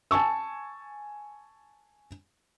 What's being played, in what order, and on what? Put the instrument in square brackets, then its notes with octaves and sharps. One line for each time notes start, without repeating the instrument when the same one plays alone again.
[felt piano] G#5 A5 C#6 E6